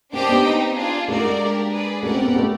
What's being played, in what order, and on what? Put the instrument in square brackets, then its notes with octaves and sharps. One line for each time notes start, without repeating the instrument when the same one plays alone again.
[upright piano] A#3 [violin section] D4 G4 C5 D#5 G5
[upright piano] B3
[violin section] C4 D#4 G4
D4 F4 G#4
[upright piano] A3 [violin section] A#3 D#4 F#4 A#4 D5
[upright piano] G#3
[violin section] D4 G4 A#4
G#4 B4 D5
[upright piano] A3 [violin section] G4 A#4 D5 F#5
[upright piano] C4
B3
A3